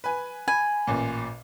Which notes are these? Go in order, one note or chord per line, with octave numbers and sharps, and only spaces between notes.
B4 G#5
G#5 B5
A1 A#2